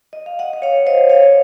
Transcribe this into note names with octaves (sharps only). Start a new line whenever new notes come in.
D#5
F5
D#5 F#5
D#5
C#5 F5
C5 D#5
C#5 F5